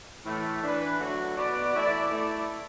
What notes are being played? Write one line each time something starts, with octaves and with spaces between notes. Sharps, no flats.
A2 E3 A3
E3 D4 B4
D3 F#3 A3 F#4
B2 B3 F#4 D5
E3 A3 E4 D5
A3 E4 D5